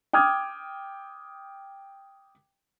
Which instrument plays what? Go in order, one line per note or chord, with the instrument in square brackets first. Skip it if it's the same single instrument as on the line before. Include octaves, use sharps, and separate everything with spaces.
[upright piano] G5 D6 D#6 F6 G#6